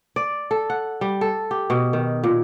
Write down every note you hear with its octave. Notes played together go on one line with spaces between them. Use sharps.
D5
A4
F#5
G3
A4
G4
B2
D#3
A#2